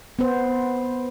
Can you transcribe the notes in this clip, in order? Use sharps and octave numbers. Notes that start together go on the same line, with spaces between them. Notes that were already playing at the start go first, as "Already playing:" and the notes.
B3 C5